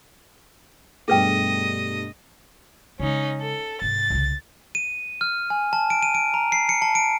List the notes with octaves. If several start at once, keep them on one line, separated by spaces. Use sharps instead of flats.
G2 B2 A3 G#4 B4 D#5 G5
C#3 G#3 C#4 D#4
A4
G#2 C3 A6
C2 C#3
D#7
F6
G#5
A5
D7
D#7
D7
A#5
C7
C#7
A5
D7